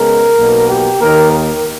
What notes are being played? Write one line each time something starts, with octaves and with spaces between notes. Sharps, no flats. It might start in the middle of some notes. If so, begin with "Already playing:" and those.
Already playing: C#3 G#3 B3 A#4
B1 B2 A#3
G4
D#2 D#3 A#3 A#4
A#4